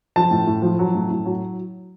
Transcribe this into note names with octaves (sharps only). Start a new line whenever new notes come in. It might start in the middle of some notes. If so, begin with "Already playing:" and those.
F3 A5
A2
A2
F3
F#3
A2
A2
F#3